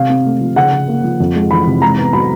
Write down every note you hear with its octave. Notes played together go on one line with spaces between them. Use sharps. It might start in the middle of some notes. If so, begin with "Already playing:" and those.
Already playing: C3 F5
C4
A3
F3
C#3 F#5
C#3
A#3
F3
F2
G#3
E3 B5
C3
G#2 A#5
B3
F#3 B5